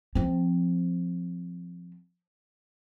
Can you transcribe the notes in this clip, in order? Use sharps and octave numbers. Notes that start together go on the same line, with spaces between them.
F3 C4